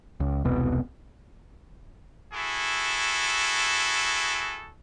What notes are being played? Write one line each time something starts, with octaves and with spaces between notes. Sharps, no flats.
C#2
E1 C2 B2
E4 F#4 G#4 A4